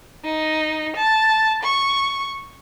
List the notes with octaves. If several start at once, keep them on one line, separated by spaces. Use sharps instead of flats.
D#4
A5
C#6